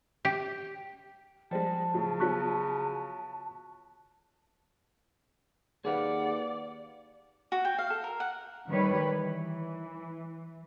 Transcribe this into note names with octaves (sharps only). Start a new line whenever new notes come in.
G4
F3 G3 G#3 C5 A5
A2 C#3 F#3
F3 F#3 B3 C#6 F#6 B6
D#2 G#4 B4 D5 F5 F#5
F#4
G5
F5
A4
A#4
F#5
D#3 G3 B4 C#5
E3